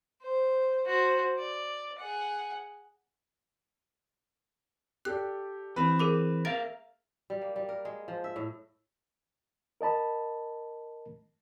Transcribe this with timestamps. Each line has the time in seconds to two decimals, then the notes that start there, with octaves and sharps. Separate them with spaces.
0.22 C5
0.86 F#4 C5
1.38 D5
1.99 G#4 F#5
5.05 G4 A4 D5 F#6
5.76 E3 C4 B4
6.00 G#4 A#4 D6
6.45 A#4 E5 F5 A6 D7
7.30 G3
7.42 A#3
7.56 G3
7.69 A#4
7.85 G#3
8.08 F3
8.24 E5
8.36 A2
9.81 A#4 D#5 A5 B5